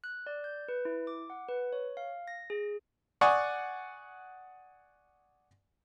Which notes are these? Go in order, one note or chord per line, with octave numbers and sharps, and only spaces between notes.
F#6
D5
G6
B4
E4
D6
F#5
B4
C#5
F5
A#6
G#4
D5 F#5 G#5 C#6 D#6